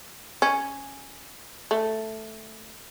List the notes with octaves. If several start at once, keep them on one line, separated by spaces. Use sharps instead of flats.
C#4
A3